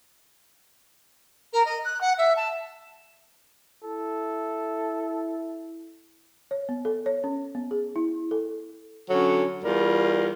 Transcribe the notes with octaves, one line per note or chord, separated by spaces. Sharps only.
A#4
D#5
F#6
F#5
E5
A5
E4 A4
C#5
B3
A4
C#5
C#4
B3
G#4
E4
A4
D3 F#3 C#4 A4
E2 G3 F4 A#4